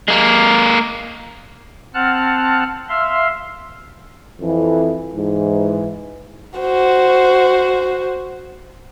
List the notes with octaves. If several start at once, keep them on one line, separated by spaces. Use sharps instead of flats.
G#3 A#3
C4 F#5 A5 F6 F#6
E5 F5 C6
F2 E3
G#2 E3
F#4 C5